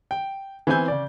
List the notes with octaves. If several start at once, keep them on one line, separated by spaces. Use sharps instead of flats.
G5
E3 B3 C4 E4 G#5 G6
C#3 D5